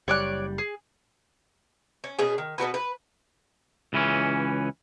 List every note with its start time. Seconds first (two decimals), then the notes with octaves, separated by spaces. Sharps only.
0.08 F#1 G3 C#5 D5 F#6
0.58 G#4
2.04 C#4
2.19 B2 C#4 G#4
2.38 D#3
2.58 B2 B3 F#4 B4
2.74 B4
3.93 C#2 E3 C#4